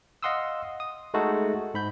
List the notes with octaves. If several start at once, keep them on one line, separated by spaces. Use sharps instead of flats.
D#5 F5 F#5 C6 D#6 E6
D#6
G#3 A3 D#4 F#4 A4
G#2 B5 G6